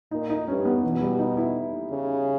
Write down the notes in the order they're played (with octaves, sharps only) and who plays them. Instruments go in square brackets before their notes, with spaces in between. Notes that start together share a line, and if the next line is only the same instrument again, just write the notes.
[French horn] A#2 [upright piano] D#4
[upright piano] D#4
[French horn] G2 [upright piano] C#4
[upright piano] B3
[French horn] B2 [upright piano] E3
[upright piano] G3
D#4
E4
[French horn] C#3